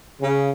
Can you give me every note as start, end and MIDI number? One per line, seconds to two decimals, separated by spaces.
0.21 0.49 49